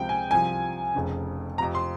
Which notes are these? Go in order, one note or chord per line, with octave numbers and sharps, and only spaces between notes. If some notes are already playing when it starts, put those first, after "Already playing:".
Already playing: C#2 C3 F3 C4 G5
G#5
C2 C3 F3 G#5
F1 F2 C#3
F2 C3 F3 A#5
C6